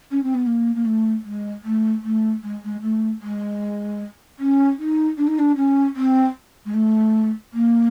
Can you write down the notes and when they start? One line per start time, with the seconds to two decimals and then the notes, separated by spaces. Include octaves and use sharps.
0.11 C#4
0.23 C4
0.34 B3
0.46 A#3
0.75 A#3
0.85 A3
1.24 G#3
1.64 A3
2.03 A3
2.43 G#3
2.64 G#3
2.81 A3
3.21 G#3
4.39 C#4
4.79 D#4
5.18 D4
5.27 D#4
5.39 D4
5.56 C#4
5.96 C4
6.65 G#3
6.74 A3
7.53 A#3